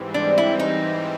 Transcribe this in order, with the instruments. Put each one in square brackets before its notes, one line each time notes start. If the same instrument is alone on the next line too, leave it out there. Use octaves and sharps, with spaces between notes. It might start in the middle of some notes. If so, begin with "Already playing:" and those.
Already playing: [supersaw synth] G#2 E3 G3 C4
[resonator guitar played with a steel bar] D4
E4
D#4